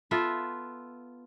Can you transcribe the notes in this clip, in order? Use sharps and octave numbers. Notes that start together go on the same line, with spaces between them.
B3 F4 A4 E5